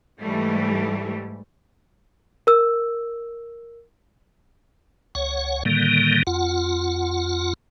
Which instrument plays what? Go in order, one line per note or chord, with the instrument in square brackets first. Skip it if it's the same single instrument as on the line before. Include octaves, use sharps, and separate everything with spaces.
[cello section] G#2 E3 G3 A3
[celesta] A#4 E6
[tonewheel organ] C#2 C#5 F#5
A2 D3 D#3 G3 A#3
F2 F4 F#5